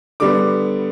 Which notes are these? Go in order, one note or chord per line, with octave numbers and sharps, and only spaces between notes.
D3 G3 B3 D6